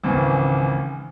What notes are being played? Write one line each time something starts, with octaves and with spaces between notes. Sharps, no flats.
G#1 C#2 C#3 E3